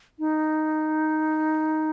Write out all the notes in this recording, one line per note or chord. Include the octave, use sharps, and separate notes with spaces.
D#4